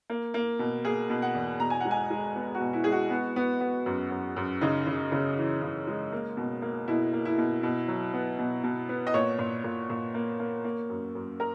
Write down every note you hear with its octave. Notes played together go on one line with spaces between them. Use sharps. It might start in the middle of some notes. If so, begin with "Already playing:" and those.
A#3
A#3
B2
A#3 G#4
B2
F#5
E2
B2 A#5
G#5
G#3 F#5
G#5
G#3
B3
F#4
B2
E4
G#3 G#4
F#4
B3
B3
B3
F#2
F#2
F#2
C#3 D#4
C#3
C#3
E3
C#3
G#3
A#3
B2
A#3
B2 E4
A#3
E4
B2
B2
F#3
B3
B2
B2
B3
D#5
A#2 C#5
A#2
A#2
A#2
A#3
A#3
A#3
F#2
F#2
A#4